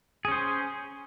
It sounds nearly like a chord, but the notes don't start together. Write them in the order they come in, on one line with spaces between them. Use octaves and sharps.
G#4 C#4 C5